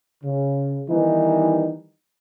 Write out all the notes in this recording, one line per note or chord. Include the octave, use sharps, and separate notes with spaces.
C#3
D#3 E3 G3 B3 D#4